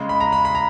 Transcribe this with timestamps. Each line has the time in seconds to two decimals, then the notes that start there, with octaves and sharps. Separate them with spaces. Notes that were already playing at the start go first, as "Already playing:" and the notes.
Already playing: C#3 G#3
0.09 B5
0.20 A#5
0.32 B5
0.45 B5
0.55 A#5